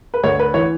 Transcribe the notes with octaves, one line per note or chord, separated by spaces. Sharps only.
B4
D2 C#5
B4
E3 C#5